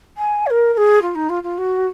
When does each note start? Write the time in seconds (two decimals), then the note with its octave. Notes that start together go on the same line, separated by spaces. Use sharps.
0.18 G#5
0.46 C#5
0.50 A#4
0.74 A#4
0.77 G#4
1.02 F4
1.15 D#4
1.29 F4
1.43 F4
1.58 F#4